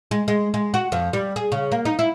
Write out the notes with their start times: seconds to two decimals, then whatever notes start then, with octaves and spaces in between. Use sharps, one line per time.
0.11 G#3
0.28 G#3
0.54 G#3
0.74 F#4
0.92 F2
1.13 G3
1.36 G#4
1.52 C#3
1.72 A#3
1.85 D#4
1.99 E4